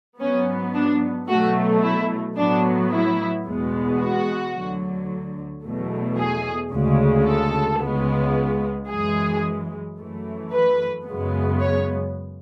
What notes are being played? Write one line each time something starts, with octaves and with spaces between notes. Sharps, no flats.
G#2 F#3 B3 C#4
D4
B2 F#3 A3 F#4
E4
A2 F#3 B3 D4
E4
E2 B2 G#3 B3
F#4
D2 D3 F#3
E2 B2 F#3 A3
G#4
D2 C#3 G#3
A4
C#2 C#3 G#3 B3
F#2 E3 G#3 G#4
F#2 E3 A3
B4
F#2 C#3 G#3 B3
C#5